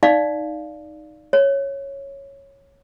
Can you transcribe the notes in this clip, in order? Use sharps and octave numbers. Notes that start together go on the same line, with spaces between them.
D#4 D5 F5
C#5